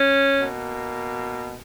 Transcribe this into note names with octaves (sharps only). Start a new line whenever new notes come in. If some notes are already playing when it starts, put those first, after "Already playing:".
Already playing: C#4
B2 A#3